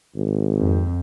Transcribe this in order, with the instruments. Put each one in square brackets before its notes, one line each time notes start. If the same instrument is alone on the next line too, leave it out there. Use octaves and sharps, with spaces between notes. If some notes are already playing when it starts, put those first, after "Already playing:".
[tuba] G#1
[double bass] F2